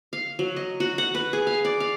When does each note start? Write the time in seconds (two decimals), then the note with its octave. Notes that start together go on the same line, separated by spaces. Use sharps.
0.13 F5
0.39 F#3
0.56 D#5
0.80 F#4
0.98 F#5
1.15 B4
1.33 G#4
1.47 F5
1.65 D5
1.80 F5